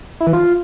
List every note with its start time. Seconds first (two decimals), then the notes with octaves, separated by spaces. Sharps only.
0.20 E4
0.27 E3
0.33 F4